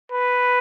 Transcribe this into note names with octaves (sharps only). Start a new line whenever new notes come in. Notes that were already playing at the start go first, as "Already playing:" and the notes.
B4